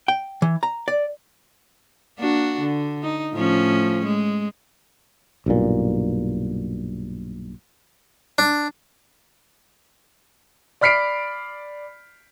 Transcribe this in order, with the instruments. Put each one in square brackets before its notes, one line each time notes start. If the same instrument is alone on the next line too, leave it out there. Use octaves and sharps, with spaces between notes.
[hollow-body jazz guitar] G5
E3
A#5
D5
[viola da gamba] A#3 D4 F#4
D3
D#4
A2 F3 C#4
G#3
[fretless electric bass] B1 G2 A#2
[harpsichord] D4
[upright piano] D5 B5 F6 B6 C7 D7